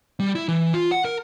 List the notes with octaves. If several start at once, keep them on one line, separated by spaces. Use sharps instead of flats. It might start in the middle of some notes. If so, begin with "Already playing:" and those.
G3
E4
E3
F4
F#5
A#4